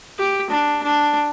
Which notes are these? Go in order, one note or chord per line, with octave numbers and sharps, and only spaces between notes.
G4
D4
D4